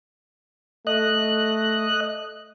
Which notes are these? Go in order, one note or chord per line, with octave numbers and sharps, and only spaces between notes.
A3 D#5 F#6